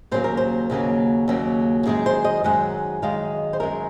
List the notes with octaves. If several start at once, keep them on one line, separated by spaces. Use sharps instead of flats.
D#2 C#3 F#3 A#3 C5
A#4
C5
D#2 C#3 F#3 A#3
D#2 C#3 F#3 A#3
F#2 D#3 G#3 G#4
C5
D#5
F#2 D#3 G#3 F#5
F#2 D#3 G#3 F5
C5
F#2 D#3 G#3 A#4